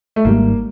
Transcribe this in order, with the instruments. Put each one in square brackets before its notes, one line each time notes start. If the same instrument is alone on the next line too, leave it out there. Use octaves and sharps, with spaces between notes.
[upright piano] A3
[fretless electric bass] G#1 G#2 D#3 G3 [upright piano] A#3